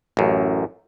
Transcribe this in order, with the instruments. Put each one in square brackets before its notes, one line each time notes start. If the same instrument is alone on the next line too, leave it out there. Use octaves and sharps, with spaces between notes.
[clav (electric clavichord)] A1 F#2